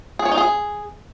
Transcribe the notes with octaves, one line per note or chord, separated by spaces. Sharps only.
G#4
C#5
D#4
G#4